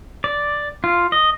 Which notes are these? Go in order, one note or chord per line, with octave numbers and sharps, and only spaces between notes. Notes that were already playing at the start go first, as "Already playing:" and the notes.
D5
F4
D#5